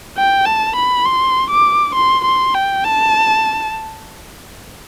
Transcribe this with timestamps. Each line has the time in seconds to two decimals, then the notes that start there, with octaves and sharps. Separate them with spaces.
0.17 G5
0.46 A5
0.76 B5
1.06 C6
1.50 D6
1.95 C6
2.24 C6
2.54 G5
2.84 A5